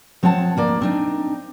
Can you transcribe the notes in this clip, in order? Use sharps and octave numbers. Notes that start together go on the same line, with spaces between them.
F3 C4 C#5 F#5 A5
D2 A#3 D5
C4 D4 D#4